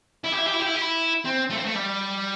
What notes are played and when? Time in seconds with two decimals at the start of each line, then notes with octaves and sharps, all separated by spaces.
0.24 E4
0.32 G4
0.38 E4
0.46 G4
0.54 E4
0.60 G4
0.67 E4
0.75 G4
0.82 E4
1.25 C4
1.50 A3
1.58 C4
1.66 A3
1.76 G3